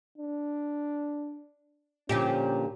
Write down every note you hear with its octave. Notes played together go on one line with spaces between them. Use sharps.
D4
A#2 D3 F3 C#4 G4